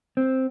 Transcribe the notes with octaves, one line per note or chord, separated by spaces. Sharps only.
C4